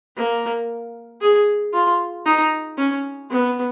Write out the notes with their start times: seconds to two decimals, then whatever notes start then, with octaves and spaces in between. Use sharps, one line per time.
0.16 A#3
1.21 G#4
1.74 F4
2.26 D#4
2.78 C#4
3.30 B3